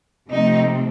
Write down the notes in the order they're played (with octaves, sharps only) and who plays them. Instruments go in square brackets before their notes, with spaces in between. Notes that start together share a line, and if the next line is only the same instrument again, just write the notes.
[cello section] C3 F3 A3 C4 D#4